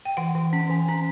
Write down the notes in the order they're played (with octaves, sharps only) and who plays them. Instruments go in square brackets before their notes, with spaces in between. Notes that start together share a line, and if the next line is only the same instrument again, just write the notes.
[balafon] G5
E3 F#5
E3
C#4
E3 G#5
C#4 A#5